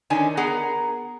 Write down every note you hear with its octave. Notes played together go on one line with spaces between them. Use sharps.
D3 D#3 C#4 D4 G#5
B3 G#4 A#4 F#5 A#5